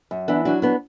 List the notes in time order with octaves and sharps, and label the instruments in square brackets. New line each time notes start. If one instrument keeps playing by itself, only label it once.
[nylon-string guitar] F#2
E3 B3 D4
F#3 D4 F#4
B3 D4